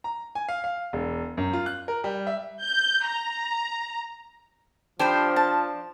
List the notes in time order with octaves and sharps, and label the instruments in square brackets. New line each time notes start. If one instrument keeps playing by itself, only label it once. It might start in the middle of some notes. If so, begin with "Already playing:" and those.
[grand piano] A#5
G#5
F5
F5
E1
F#2
F4
F#6
A#4
G3
E5
[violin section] G6
A#5
[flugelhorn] F3 [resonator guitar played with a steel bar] D4 C5 [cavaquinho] G4 B5
[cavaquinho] A5